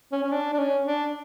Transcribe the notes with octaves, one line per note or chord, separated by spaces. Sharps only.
C#4
C#4
D4
D4
C#4
D4